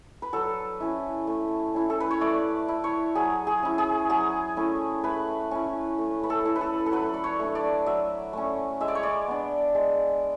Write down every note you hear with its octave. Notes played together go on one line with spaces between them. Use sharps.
B4
F#3 A4
C#4 E4
A3
C#4 E4
A4
B4
C#5
A3 D5
E4
C#5
F#3 G#4
G#4
C#4 E4
G#4
F#3 G#4
A3 C#4 E4
A3 B4
C#4 E4
A3
B4
A4
E4
B4
A4
A4
F#3 B4
D5
C#5
A3 D4
D5
F#3 E5
A3 C#4
G#3 E5
D5
C#5
D5
B3 D4
G#3